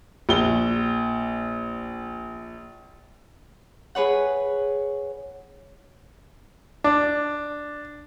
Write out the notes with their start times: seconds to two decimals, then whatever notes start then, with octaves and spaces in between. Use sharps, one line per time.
0.29 A#1 G7
3.95 G#4 B4 C#5 F#5
6.84 D4